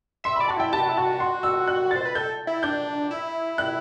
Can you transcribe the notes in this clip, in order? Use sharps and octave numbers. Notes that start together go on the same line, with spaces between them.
E5 C6
B5
D5
A5
F#4
E4 G5
G4 A5
F#4
E4
F#4 A5
C6
E6
F#6
A6
C5
B4
A4 G6
E4
D4 G6
E4
F#6